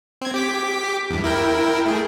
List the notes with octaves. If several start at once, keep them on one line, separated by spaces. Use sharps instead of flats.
C4 G#6
G4 D6 B6
E2 G2
E4 A#4 G5
A3 G#4